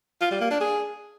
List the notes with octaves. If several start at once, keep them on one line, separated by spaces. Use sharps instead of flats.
F4
G3
A#3
D4
G#4